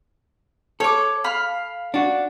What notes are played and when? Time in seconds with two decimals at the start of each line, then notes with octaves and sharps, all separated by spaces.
0.80 A4 C#5 D6
1.24 F5 B5
1.94 D4 F#4